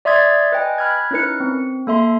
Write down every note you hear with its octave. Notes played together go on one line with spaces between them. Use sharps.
D5 E5 C6 D#6 G#6 A6
B4 D#5 G5 G#5
B5 F6 F#6 G#6
C#4 D#4 E4 A#4 B4 C#7
C4
A#3 A4 E5 C6